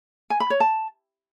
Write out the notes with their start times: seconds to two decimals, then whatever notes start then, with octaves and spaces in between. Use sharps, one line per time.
0.30 G#5
0.40 B5
0.50 C#5
0.60 A5